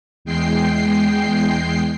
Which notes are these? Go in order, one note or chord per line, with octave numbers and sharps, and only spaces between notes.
E2 G#3 G5 C7